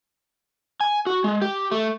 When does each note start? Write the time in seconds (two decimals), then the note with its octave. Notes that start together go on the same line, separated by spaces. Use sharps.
0.81 G#5
1.06 F#4
1.24 G#3
1.42 G4
1.71 A3